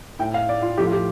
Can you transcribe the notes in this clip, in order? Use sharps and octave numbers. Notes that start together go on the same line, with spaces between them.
A2 A3 G5
F5
D5
F4
A2 F3 A3 G4
F4
G4